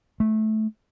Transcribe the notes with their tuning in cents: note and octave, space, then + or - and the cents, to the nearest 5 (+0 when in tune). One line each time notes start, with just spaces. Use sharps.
A3 -15